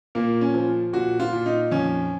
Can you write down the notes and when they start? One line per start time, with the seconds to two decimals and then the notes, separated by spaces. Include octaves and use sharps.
0.15 A#2 A#3
0.41 C#4
0.54 F3
0.93 A#2 F#4
1.20 F4
1.33 A#2
1.46 D#4
1.71 F2 C#4